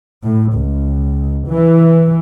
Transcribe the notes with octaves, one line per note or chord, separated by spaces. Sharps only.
A2
C#2
E3